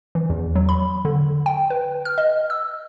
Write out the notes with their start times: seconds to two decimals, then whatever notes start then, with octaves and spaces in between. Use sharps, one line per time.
0.15 E3
0.30 E2
0.55 F#3
0.69 B5
1.05 D3
1.46 G5
1.70 B4
2.05 F6
2.18 D#5
2.50 E6